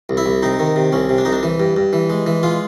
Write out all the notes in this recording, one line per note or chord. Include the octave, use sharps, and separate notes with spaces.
C2
E4
C2
C3 D#4
D#3
C3
C2 C#4
C3
D4
C2 D#4
D4
E3
G2
G2
E3
G#3
E3
G#3 F4